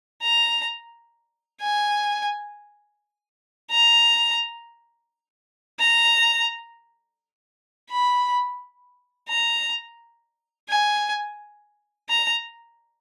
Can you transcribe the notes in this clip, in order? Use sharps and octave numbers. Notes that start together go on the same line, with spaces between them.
A#5
G#5
A#5
A#5
B5
A#5
G#5
A#5